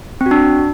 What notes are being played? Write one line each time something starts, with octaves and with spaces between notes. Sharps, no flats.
C4
F#4
D4